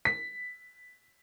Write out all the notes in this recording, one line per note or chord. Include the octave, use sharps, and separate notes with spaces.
B6